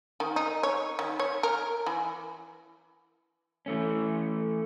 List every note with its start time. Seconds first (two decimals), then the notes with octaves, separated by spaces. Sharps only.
0.20 D#3
0.36 D#4
0.63 C#5
0.99 D#3
1.20 C#5
1.43 A#4
1.86 E3
3.66 E3 A3 C#4